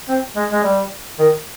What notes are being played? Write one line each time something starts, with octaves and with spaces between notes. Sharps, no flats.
C4
G#3
G#3
G3
D#3